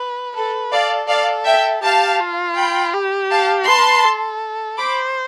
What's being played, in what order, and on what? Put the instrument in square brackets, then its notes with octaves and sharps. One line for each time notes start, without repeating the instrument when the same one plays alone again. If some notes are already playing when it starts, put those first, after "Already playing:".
Already playing: [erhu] B4
[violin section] A4 [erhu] B4
[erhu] A4 [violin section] D5 F5
[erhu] A4 [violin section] D5 F5
[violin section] E5 G5
[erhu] G4 [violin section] F5 A5
[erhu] F4
[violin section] G5 B5
[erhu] G4
[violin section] F5 A5
[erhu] B4 [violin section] A5 C6
[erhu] A4
[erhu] C5 [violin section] B5 D6